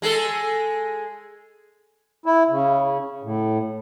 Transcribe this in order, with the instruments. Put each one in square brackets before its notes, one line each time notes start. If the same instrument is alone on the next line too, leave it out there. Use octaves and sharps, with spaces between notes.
[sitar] G#3 G#4 A4
[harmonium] E4
C#3
A2